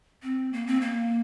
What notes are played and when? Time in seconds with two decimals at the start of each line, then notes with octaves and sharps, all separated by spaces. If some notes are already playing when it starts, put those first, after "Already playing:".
0.22 C4
0.53 A#3
0.67 C4
0.81 A#3